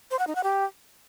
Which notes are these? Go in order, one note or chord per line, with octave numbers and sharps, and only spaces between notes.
C5
F#5
D#4
F#5
G4